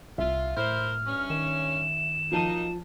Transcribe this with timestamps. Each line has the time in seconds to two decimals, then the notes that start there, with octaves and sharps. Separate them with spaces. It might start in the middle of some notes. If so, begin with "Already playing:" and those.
0.18 C2 F4 E5
0.57 A2 E4 A#4 C5 F6
1.05 G2 C#4
1.30 D#3 E7
2.32 F3 F#3 A#3 D#4 A5 D#7